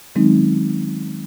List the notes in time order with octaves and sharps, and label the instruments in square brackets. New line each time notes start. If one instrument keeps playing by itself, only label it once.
[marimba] D#3 F#3 G#3 C4 C#4 D#4